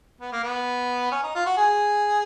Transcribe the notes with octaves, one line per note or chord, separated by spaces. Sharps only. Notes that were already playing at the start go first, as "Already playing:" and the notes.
B3
A#3
B3
C#4
D#4
F4
F#4
G#4